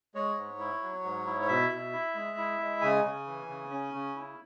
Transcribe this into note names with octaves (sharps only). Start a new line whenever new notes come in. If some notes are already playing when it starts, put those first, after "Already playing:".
G#3 C#5
G#2
E4
F#3
G#2
E4
C#5
B2 E5
B2
E4
G#3
E4
G#3
C#3 G#5
C#3
E3
C#3
C#4
C#3
E4